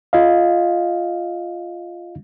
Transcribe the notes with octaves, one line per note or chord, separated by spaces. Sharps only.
F4 D#5 F5